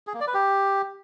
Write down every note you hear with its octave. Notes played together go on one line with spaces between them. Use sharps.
G#4
A#3
D5
B4
G4